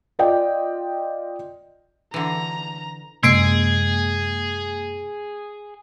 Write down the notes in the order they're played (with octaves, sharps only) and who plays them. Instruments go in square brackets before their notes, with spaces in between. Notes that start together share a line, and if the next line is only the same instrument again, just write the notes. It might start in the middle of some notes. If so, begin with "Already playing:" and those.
[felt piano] F4 D5 D#5 G5
[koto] D3 E3 [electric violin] A#5
[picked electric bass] F#2 C3 G#3 [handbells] A#3 C7 D7 [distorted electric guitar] G#4